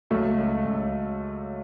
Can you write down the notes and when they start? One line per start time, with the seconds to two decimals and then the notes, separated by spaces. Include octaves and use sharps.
0.10 C#2 F#3 A3
0.38 C#2
0.65 C#2